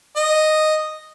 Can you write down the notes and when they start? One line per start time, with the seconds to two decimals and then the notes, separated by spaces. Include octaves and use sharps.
0.16 D#5